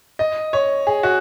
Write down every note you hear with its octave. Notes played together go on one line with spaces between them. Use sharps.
D#5
C#5
G#4
F#4